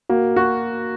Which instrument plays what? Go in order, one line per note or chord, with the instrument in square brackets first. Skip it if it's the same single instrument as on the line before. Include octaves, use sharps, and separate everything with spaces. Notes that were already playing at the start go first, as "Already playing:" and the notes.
[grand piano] A#3 [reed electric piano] F#4
[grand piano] F#4